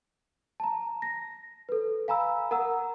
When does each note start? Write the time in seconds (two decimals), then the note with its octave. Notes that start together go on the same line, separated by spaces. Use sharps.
0.60 A5 A#5
1.02 A#6
1.69 A4 B4
2.08 F5 G#5 A#5 B5 E6
2.51 A#4 F#5 A#5 E6